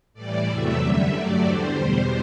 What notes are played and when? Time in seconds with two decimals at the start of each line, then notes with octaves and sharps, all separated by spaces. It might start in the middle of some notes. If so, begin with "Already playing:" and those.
0.14 A2 E3 G3 D5
0.46 E2 C3 F#3 A3 E5
0.79 F#2 D3 G3
1.12 G2 F#3 A3 D5
1.44 E2 D3 G3 C5
1.76 E2 B2 G3 C5